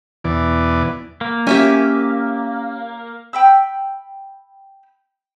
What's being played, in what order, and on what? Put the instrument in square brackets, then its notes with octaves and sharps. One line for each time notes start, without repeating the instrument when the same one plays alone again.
[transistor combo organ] E2 B2 E3 D5
[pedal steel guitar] A#3
[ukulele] C#4 [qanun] G4 E5 G#5
[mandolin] G5 B5 E6